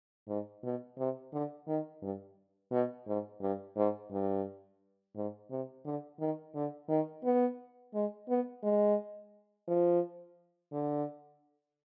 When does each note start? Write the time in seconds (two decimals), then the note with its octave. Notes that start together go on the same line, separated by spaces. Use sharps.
0.28 G#2
0.64 B2
0.98 C3
1.33 D3
1.67 D#3
2.02 G2
2.71 B2
3.07 G#2
3.41 G2
3.76 G#2
4.11 G2
5.16 G#2
5.50 C3
5.85 D3
6.20 D#3
6.55 D3
6.89 D#3
7.24 B3
7.94 G#3
8.29 B3
8.63 G#3
9.68 F3
10.72 D3